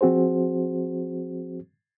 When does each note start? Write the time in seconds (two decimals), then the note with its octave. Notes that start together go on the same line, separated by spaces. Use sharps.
0.01 F3 C4 F#4 G#4 C5